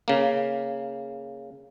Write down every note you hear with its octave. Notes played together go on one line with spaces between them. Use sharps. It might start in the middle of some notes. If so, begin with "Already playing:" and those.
C#3 A#3